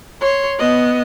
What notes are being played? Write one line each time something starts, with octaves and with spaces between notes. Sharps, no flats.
C#5 C6
B3 D#5